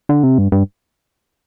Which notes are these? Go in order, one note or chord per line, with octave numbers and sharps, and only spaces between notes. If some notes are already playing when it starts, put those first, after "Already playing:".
D3
C3
G2
G2